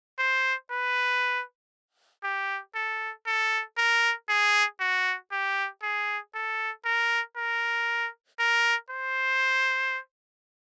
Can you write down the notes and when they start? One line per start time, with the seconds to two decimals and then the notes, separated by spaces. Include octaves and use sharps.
0.19 C5
0.71 B4
2.24 G4
2.75 A4
3.27 A4
3.78 A#4
4.29 G#4
4.80 F#4
5.32 G4
5.83 G#4
6.35 A4
6.85 A#4
7.37 A#4
8.40 A#4
8.91 C5